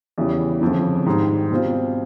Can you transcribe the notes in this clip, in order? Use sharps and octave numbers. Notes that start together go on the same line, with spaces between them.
E2 C#3 E3 G3
G1 F2 C#3
G#2 D#3 G3
B2 G3 C4 F4